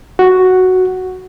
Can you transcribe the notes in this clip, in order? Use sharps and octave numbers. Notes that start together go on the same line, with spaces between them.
F#4